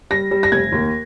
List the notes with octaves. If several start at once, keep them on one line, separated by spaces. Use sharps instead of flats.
G3 A#6
G3
A#6
F1 G#6
D#2